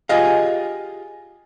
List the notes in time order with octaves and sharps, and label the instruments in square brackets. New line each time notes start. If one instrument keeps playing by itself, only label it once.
[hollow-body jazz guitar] F4 G4 G#4 D#5 F5